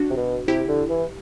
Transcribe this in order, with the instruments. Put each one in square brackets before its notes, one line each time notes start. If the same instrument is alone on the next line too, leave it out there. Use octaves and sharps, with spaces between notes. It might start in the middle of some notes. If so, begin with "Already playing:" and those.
Already playing: [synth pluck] D4 F#4
[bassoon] C3
B2
[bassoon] C3 [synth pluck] E4 G4
[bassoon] D3
E3